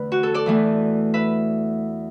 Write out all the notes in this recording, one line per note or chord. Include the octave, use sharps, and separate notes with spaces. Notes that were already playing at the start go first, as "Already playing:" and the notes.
Already playing: E2 D3 A3 B4 D5
F#4
A4
A4 D5
E2 E3 A3 E4
B4 E5